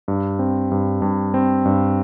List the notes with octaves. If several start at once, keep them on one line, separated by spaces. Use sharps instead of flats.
G2
C4
G2
G2
C4
G2